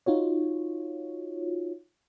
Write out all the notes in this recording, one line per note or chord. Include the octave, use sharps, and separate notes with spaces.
D#4 F4 F#4 C#5